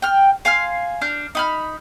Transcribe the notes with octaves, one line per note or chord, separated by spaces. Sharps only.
G5 F6
F5 G#5 C6 F6
D4 F6 G6
D#4 B5 F6